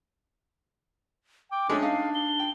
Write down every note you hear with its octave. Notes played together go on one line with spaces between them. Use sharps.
G5 D6
G#3 A3 C#4 D4
D#4 F5
G7
G5